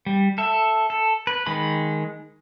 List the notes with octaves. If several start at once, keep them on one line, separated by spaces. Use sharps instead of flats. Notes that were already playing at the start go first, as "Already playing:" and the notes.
G3
A4 E5
A4
B4
D#3 G#3 B5